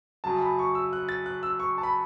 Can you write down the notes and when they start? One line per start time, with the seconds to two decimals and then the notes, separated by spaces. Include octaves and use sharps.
0.24 F#2 C#3 F#3 A5
0.41 B5
0.59 C#6
0.75 E6
0.93 F#6
1.09 A6
1.26 F#6
1.43 E6
1.60 C#6
1.78 A5
1.83 B5